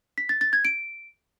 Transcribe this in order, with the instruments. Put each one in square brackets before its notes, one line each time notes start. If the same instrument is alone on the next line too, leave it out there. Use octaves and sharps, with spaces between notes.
[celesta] B6
A6
A6
G#6
D7